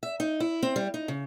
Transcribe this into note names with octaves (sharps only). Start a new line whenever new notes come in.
E5
D#4
E4
C4
G3
D#4
C#3